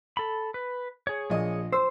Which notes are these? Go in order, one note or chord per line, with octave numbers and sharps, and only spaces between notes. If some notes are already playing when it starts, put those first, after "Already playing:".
A4 B5
B4
G#4 C#5
A#1 D#5 D#6
C5 E6